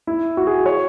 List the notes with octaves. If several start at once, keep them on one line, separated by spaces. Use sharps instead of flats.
E4
F#4
G#4
C#5